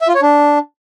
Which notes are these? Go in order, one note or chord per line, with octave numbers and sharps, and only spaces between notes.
E5
F4
C#5
D4